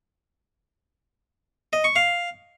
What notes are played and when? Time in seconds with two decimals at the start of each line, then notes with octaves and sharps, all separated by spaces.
1.73 D#5
1.84 C#6
1.96 F5